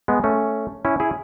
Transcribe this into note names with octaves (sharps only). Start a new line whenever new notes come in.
G#3 B3
A3 C#4
C#4 E4
E4 G#4